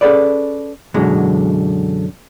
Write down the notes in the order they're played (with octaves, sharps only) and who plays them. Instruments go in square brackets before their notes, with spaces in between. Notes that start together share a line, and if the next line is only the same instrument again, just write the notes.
[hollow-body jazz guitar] C#4 G#4 A4 B4 D5
F#2 B2 D3 E3 F#3 G#3